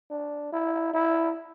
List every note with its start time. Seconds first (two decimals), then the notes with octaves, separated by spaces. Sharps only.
0.11 D4
0.52 E4
0.94 E4